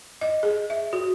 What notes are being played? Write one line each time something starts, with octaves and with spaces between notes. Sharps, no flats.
D#5
G#4
E5
F#4